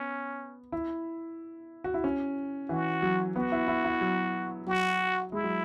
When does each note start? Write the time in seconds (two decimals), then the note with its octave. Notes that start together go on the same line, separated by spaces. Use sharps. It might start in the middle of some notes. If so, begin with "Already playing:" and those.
Already playing: B3 C#4
0.72 E4
1.84 F#4
1.94 E4
2.04 C#4
2.69 E3 F#4
3.02 F#3
3.36 B3 F#4
3.52 E4
3.68 E4
3.85 E4
4.01 F#3
4.67 F#3 F#4
5.32 G#3 E4
5.44 F#3